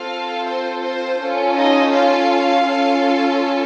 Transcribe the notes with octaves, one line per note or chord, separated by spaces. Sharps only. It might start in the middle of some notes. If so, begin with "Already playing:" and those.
Already playing: C4 F4 A4 F5
C5
C5
C#4 F4 A4
D#4 D#5
F4 F5
C#4 F4 A4